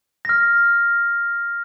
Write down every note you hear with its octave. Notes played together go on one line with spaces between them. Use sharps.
F6 A#6